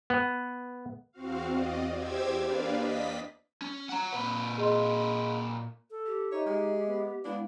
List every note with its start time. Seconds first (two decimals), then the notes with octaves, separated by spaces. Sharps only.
0.10 B3
1.13 E2 C4 F#4 F5
1.48 D5 D#5
1.93 E2 G4 C5 D6 E6 G#6
2.39 A#3 D4 B4 D5 F5
2.75 D5 D#5 B6
3.62 C#4
3.89 F#5 A#5
4.13 A#2 B4
4.58 G#4 D#5 C6
5.91 A4
6.06 G4
6.32 D#4 C#5 D#5 E5
6.46 G#3
6.87 B3
7.24 G#3 B3 D4 E4 F5